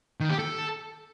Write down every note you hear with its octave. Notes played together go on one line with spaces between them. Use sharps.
D#3
G4
A4